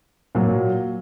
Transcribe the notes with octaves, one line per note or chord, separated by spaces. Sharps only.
A#2 F#3